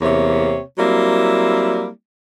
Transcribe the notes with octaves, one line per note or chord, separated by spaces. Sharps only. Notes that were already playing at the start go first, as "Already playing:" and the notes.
E2 C3 A#3 C#5
F#3 G3 A#3 C4 E4